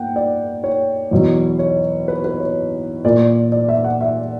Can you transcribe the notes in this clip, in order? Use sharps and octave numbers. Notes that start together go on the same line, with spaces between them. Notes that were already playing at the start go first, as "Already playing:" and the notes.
Already playing: A#3 F#5 G5
D5
C#5
E2 B2 F#3
C#5
B4
B4
C#5
A#2 A#3 D5
D5
E5
F#5
E5